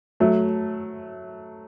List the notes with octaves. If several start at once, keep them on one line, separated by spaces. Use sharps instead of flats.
F#3 A3